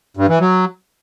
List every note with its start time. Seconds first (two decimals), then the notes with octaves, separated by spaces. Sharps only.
0.17 G2
0.28 E3
0.40 F#3